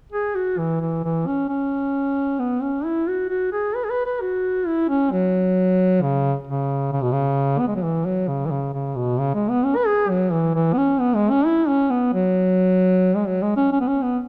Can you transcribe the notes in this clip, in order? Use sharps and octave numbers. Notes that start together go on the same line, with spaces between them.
G#4
F#4
E3
E3
E3
C#4
C#4
B3
C#4
E4
F#4
F#4
G#4
B4
G#4
B4
B4
F#4
E4
C#4
F#3
C#3
C#3
C#3
B2
C#3
B3
G#3
F#3
E3
F#3
C#3
E3
C#3
C#3
B2
C#3
G#3
B3
C#4
B4
G#4
F#3
E3
E3
B3
C#4
B3
G#3
C#4
E4
C#4
B3
F#3
G#3
F#3
G#3
C#4
C#4
B3
C#4
B3